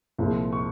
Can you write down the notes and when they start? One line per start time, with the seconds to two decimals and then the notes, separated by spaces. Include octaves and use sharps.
0.18 C2 A#2 F3 G#3
0.53 C#6